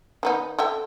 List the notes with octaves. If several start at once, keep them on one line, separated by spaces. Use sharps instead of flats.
D#3 B3 D#4
A4 E5 G5